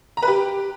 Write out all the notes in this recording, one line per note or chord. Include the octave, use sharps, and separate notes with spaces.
A#5
B4
G4